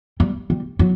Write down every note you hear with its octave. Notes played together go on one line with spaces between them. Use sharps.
G3
G3
F#3